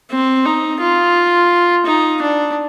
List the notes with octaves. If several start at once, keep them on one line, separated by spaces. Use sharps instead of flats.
C4
D#4
F4
D#4
D4